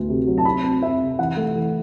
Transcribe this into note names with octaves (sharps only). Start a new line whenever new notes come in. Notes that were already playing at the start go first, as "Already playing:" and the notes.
Already playing: D2 A3 B3
C3
F#3
A5
C4 B5
C4
C4 E5
C3
E3 F#5
A3
E3